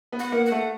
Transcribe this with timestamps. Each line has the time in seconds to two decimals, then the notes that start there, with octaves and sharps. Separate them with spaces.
0.12 B3
0.19 F#5
0.32 A#3
0.46 F#5
0.51 A3